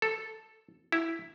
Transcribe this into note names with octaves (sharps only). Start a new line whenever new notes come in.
A4
E4